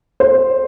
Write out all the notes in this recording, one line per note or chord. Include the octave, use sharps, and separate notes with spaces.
C5